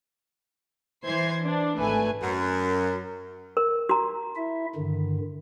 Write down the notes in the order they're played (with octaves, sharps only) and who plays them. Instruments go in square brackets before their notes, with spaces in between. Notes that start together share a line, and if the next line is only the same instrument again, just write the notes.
[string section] E3 C5 G#6 C7
D4
G#1 A3 B4 G#5
[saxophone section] F#2
[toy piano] A#4
F#4 A#5
[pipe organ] E4 E5
G2 D3 D#3